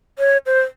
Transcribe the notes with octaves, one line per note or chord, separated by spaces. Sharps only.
C#5
C5